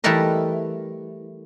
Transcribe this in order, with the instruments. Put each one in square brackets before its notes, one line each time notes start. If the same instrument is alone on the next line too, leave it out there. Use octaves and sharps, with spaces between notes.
[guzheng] E3 G3 A3 A4 A#4 D#5